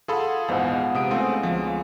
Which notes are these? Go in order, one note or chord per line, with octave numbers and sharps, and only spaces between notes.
F4 G#4 A4 F#5 B5
A#1 E2 G#2 B2 B3
C3 D#6 D7
C#3 A3 C4 F4
D2 F3